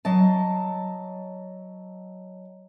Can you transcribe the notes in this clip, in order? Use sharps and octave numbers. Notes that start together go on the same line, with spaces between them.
F#3 D#5 A5